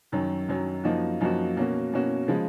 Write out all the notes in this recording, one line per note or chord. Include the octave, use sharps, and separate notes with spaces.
F#2 D#3 F#3
F#2 D#3 F#3
F#2 F3 A#3 D#4 F#4
F#2 F3 A#3 D#4 F#4
B2 A#3 C#4 F#4
B2 A#3 C#4 F#4
C#3 F3 G#3